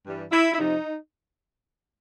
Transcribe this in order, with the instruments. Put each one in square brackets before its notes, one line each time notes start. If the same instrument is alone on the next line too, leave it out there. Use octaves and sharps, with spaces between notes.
[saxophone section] G2 E3 G3
E4
E4
F2 C3 F3 D#4